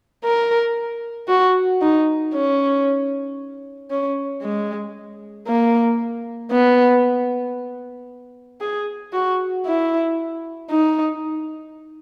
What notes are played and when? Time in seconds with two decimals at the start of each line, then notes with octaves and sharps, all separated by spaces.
0.25 A#4
1.28 F#4
1.81 D#4
2.34 C#4
3.91 C#4
4.42 G#3
5.48 A#3
6.52 B3
8.61 G#4
9.13 F#4
9.66 E4
10.71 D#4